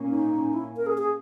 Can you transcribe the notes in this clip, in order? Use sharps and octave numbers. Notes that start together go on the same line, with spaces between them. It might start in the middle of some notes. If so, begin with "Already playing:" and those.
Already playing: A#2 A#3 C#4
D#4
E4
A#4
G#4
G#4